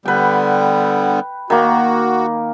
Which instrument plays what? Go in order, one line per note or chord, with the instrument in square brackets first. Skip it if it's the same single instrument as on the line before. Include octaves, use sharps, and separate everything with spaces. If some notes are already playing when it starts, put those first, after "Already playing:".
[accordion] D3 G3 B3 [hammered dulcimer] B4 G5
[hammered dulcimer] D#3 A#3 [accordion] F#4